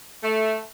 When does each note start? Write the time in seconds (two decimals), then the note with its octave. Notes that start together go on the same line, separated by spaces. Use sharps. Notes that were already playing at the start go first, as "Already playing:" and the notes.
0.23 A3